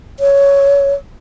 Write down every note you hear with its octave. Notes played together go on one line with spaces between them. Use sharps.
C#5